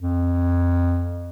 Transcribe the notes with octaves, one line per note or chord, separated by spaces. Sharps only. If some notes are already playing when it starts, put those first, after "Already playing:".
F2